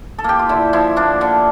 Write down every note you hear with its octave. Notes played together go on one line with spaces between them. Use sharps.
A4
A#3 G4
F4
D3 E4
F3 E4
A#3 D4
D3